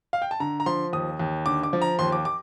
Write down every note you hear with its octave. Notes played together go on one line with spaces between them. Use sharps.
F5
G5
A5
D3 A#5
A#5
F3 C6
D#2 D#6
D#2
D3 D6
D6
F3
A#5
D#2 C6
D6
D6